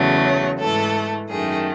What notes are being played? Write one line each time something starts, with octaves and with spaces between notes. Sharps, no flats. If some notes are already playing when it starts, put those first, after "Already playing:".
Already playing: E2 C#3 F#3 A3
C#5
G#2 E3 A3 A4
F#2 D#3 A3 G#4